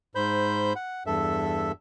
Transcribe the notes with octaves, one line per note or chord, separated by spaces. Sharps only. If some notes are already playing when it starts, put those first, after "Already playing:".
G#2 C5 B5 G6
F#5
E2 G2 A4 E5